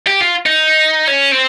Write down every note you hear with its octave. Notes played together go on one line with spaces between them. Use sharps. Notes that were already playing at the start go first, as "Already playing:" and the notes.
G4
F4
D#4
C#4
C4